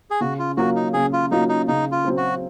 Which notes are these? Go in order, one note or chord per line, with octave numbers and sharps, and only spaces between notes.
G#4
C#3 F#4
F4
F#3 A#3 F4 F#4
D#4
C#3 G#4
F4
F#3 A#3 D#4 F4
D#4
C#3 D#4
F4
F#3 C4
F#4